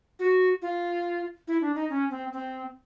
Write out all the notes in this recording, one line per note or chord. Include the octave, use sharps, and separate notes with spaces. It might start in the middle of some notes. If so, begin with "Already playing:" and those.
F#4
F4
E4
D4
D#4
C#4
C4
C4